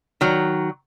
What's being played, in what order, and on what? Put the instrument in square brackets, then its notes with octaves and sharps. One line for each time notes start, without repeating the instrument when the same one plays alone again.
[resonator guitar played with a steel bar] D#3 F#3